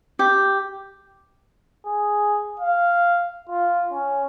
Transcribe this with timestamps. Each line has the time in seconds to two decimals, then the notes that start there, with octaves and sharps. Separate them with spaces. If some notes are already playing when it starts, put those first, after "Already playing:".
0.19 G4
1.86 G#4
2.60 F5
3.50 F4
3.93 C#4